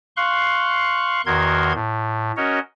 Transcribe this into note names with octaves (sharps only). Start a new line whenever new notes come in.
F5 C6 C#6 F#6
E2 D#3 F#4 A#4 C6 G#6
A2
C#4 F#4 A#4 C#5 D#5